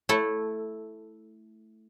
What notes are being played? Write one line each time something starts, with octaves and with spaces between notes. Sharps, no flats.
A3 E4 A4